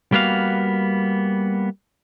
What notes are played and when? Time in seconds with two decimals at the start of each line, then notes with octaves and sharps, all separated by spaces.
0.12 G3 A#3 B3 F#4 F5